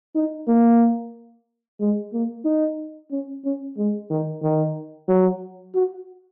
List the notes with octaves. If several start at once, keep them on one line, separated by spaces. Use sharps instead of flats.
D#4
A#3
G#3
A#3
D#4
C#4
C#4
G#3
D#3
D#3
F#3
F#4